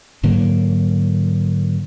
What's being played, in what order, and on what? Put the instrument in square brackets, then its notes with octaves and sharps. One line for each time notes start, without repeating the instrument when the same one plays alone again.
[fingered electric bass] G#2 D3 F#3 A#3